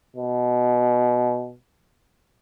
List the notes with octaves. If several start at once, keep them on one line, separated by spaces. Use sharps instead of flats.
B2